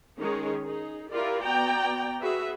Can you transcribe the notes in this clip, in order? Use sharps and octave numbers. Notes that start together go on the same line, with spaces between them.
D#3 G#3 C#4 D#4 G#4 C#5
D#4 G#4
E4 F4 G4 A#4 D5
B3 F#4 D5 G5 A#5
F#4 G#4 B4 E5